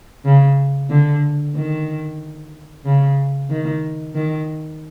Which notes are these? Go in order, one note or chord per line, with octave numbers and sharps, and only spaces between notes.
C#3
D3
D#3
C#3
D#3
D#3